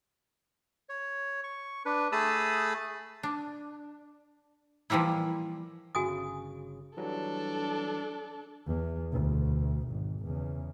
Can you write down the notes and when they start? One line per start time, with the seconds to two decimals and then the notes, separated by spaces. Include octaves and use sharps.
0.89 C#5
1.44 C#6
1.86 D4 B4
2.12 A3 G#4 A5 B5 D#6 E6
3.23 D4
4.90 E3 F3 G3 A#3 E4
5.95 G1 C#3 F#4 G#5 D#6
6.97 E3 F#3 G3 D4 A4
8.67 E2
9.12 D2 B2
9.88 G#1
10.25 E2 C#3